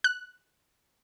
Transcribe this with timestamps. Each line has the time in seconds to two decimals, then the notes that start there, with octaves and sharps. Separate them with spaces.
0.04 F#6